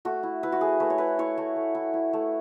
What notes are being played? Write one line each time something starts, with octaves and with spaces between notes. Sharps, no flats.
A3 F#4
E4
E4 B4
F#4
A3 G#4
A3 B4
C#5
E4 B4
E4 C#5
A3
A3
E4
E4
A3